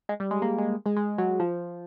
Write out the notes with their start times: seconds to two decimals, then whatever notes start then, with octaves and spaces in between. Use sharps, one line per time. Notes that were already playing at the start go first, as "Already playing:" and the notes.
0.09 G#3
0.20 G3
0.31 G#3
0.42 A#3
0.58 G#3
0.86 G#3
0.97 G#3
1.18 F#3
1.40 F3